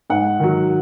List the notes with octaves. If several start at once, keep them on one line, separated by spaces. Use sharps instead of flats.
G#2 F#5
D#3 F#3